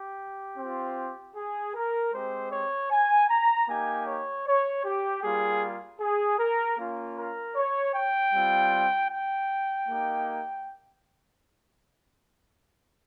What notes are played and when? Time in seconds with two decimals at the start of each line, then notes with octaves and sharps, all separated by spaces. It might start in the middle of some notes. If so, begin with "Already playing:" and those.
Already playing: G4
0.58 C4 F4
1.36 G#4
1.75 A#4
2.13 G#3 C4 G4 C5
2.52 C#5
2.91 G#5
3.30 A#5
3.69 A#3 D#4 G4 G#5
4.07 C#5
4.47 C#5
4.84 G4
5.23 G3 A#3 F4 G#4
6.01 G#4
6.39 A#4
6.78 A#3 C#4 F4
7.17 A#4
7.56 C#5
7.95 G5
8.33 G3 C4 F4
9.11 G5
9.88 A#3 D#4 G4